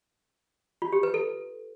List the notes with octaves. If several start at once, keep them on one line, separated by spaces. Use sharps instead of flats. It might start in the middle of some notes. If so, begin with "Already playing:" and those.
F4
G4
B4
A4